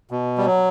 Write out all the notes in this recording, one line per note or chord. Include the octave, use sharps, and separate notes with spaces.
B2
G3
F#3